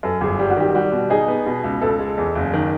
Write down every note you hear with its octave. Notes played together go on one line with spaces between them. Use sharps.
F#2 A4
G1 G#4
G3 G4
F#4
D#3 G4
G4
G3 F#4
B2
D#4 G#4
B3
B2
C#2
C#2 A4
G#3
E2
F#1
D#3